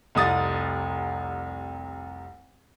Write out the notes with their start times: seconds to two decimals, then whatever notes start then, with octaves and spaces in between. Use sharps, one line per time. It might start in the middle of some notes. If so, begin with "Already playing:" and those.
0.15 F1 C2 D#6 A6